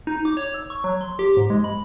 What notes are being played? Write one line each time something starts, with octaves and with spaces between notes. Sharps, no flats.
D#4
D6
C#5
E6
C#6
F#3
C6
G4
G#2
G#3
B5